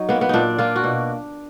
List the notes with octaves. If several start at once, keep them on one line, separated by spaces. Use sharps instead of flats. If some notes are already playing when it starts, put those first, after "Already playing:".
Already playing: F#3 D#4
A#3 B3
B3
A#2 D4 D#4
A#3 F4
F#4
B2